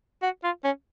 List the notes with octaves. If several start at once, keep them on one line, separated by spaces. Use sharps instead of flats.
F#4
F4
C#4